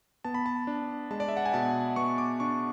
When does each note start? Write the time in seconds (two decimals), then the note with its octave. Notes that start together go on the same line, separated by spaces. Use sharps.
0.24 B3 A5
0.34 B5
0.46 A5
0.67 D4
1.11 G#3 A5
1.20 D5
1.28 E5
1.37 F#5
1.45 G#5
1.53 B2 A5
1.96 B3 C#6
2.18 D6
2.40 D4 C#6